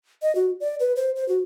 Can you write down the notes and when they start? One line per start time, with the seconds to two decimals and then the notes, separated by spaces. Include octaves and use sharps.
0.22 D#5
0.35 F#4
0.60 D5
0.80 B4
0.96 C5
1.16 C5
1.29 F#4